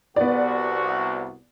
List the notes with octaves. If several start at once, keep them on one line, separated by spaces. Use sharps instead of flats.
C2 B3 F#4 D5